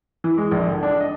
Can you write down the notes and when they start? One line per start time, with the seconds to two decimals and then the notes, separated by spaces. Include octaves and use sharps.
0.24 E3
0.38 G#3
0.51 A#1
0.68 D3
0.83 D4
1.01 D#5